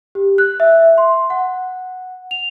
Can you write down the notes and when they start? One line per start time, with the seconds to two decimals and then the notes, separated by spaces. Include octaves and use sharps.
0.15 G4
0.38 F#6
0.60 E5
0.98 C6
1.30 F#5
2.31 F7